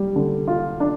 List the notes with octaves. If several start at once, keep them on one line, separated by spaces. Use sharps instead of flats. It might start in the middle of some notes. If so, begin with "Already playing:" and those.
Already playing: G3
D3
F4
D4